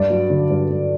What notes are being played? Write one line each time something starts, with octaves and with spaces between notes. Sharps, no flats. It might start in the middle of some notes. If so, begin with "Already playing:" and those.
Already playing: G2 D5
F#3
D3
G2
G2